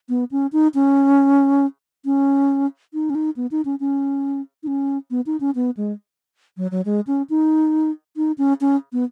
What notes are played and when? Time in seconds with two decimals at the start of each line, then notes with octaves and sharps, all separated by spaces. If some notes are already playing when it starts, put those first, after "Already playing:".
0.09 B3
0.31 C#4
0.53 D#4
0.75 C#4
2.05 C#4
2.94 D#4
3.10 C#4
3.15 D#4
3.36 B3
3.51 D#4
3.65 C#4
3.80 C#4
4.63 D#4
4.67 C#4
5.11 B3
5.26 D#4
5.40 C#4
5.55 B3
5.77 G#3
6.57 F#3
6.71 F#3
6.85 G#3
7.07 C#4
7.30 D#4
8.17 D#4
8.38 C#4
8.61 C#4
8.93 B3